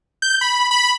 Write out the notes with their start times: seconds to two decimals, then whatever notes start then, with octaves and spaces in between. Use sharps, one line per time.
0.22 G6
0.41 B5
0.71 B5